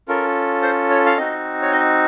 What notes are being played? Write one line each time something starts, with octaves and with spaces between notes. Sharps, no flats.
C#4 F4 A4 A#4
C5
C#5
F5
C4 D#4 F#4 D#5
C#5
D#5